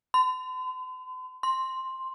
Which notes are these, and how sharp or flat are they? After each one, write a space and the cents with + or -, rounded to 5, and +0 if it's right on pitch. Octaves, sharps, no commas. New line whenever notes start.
C6 -45
C6 +5